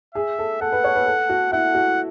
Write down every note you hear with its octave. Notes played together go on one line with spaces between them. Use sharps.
G#4 E5
A4
A4 F#5
B4
C#5
B4
A4
F#4
E4 F#5
F#4